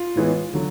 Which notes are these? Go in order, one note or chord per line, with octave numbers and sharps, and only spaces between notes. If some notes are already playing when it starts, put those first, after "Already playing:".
Already playing: F4
A2 E3 G#3 B3
D3 F#3